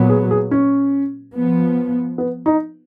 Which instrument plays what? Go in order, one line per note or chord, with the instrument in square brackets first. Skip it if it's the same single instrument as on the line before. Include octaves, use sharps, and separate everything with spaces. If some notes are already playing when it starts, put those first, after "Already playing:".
Already playing: [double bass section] A#2 F#3 B3
[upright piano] G#4
G#4
C#4
[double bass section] F3 B3
[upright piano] B3
D#4